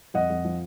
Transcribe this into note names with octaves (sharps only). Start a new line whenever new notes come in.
F2 D#5 F#5
F2
F3